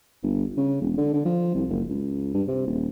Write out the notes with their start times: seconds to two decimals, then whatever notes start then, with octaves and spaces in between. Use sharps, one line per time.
0.23 G1
0.57 C#3
0.81 E1
0.98 D3
1.13 D3
1.25 F3
1.55 C2
1.69 F#1
1.89 C#2
2.34 G2
2.48 C3
2.67 D#1